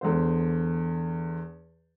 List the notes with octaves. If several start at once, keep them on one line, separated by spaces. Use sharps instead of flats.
E2 D3 C5